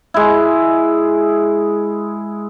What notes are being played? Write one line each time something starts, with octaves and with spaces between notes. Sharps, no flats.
G#3 E4